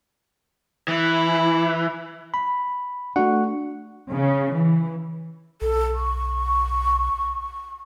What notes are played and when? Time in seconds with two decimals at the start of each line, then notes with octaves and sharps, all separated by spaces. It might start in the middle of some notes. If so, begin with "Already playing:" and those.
0.88 E3 E4
2.34 B5
3.16 A3 D4 F#4 F#5
4.11 C#3
4.53 E3
5.62 B1 A4
5.95 C#6